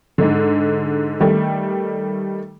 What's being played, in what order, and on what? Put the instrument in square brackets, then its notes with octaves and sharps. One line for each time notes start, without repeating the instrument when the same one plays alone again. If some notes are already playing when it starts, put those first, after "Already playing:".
[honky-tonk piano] G#2 D3
D#3 G3 A3